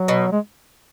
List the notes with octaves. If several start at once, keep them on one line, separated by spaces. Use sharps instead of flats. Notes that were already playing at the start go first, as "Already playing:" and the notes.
Already playing: F#3
B2
G#3